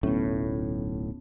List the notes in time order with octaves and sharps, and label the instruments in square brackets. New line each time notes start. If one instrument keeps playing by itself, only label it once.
[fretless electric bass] D1 B1 A2 [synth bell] B3 C#4